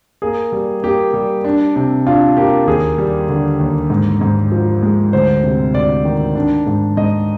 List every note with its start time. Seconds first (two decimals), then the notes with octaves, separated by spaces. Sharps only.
0.22 A#3 G#4
0.52 G3
0.83 A#3 G4
1.14 G3
1.44 D4
1.76 C3
2.06 D4 F4
2.37 A#3 G4
2.67 D#2 G#4
2.98 G3
3.29 D3
3.60 D#2
3.90 G#2
4.21 G#2
4.52 F3
4.82 G#3
5.13 D2 C5
5.43 C3
5.74 D2 D5
6.05 D#3
6.35 D4
6.67 G#2
6.97 G#2 D#5